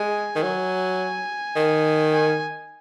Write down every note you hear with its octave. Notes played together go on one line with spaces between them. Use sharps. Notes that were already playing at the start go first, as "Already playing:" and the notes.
Already playing: G#3 G#5
D#3
F#3 G#5
D#3
G#5